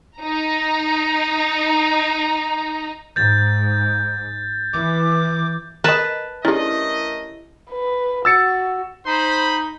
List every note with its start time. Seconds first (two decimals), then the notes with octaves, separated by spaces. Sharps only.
0.18 D#4 A#5
3.16 G#2 G6 A6
4.73 E3 D6
5.84 A#4 B4 D#5 A5
6.45 A3 C#4 D4 E4 G4 A#4 D#5
7.71 B4
8.25 F#4 E6 A6 C#7
9.07 D#4 C5 B5